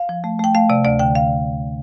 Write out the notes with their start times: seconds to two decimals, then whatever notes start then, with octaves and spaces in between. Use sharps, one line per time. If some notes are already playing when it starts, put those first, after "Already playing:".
Already playing: F5
0.09 F3
0.24 A3
0.39 A3 G5
0.55 A3 F5
0.69 C3 D5
0.85 D2 D5
0.99 D3 G5
1.15 F5